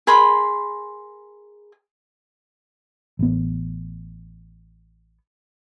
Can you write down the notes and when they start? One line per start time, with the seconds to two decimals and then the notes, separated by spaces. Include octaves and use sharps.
0.07 G#4 A#4 B5 C6
3.19 A1 B3